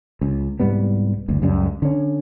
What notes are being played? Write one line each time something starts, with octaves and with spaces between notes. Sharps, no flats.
C#2
C2 G#2 G3 B3
F#1 D2
C#2 F#2 G3
D3 C#4